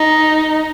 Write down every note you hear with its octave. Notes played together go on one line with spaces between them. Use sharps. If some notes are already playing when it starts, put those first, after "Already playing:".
Already playing: D#4